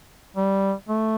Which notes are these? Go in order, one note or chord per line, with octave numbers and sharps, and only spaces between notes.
G3
A3